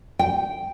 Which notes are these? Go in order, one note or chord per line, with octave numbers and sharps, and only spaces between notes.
G5